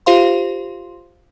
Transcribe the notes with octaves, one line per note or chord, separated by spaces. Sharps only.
F4 G4 C5 F5 C6